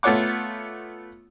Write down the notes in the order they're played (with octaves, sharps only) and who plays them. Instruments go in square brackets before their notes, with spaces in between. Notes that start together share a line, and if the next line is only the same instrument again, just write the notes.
[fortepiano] A3 B3 F4 C#5 F#5 D6